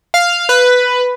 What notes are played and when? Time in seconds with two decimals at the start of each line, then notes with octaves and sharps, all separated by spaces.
0.14 F5
0.49 B4